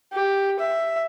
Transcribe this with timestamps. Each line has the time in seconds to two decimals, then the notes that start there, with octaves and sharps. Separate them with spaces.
0.13 G4
0.59 E5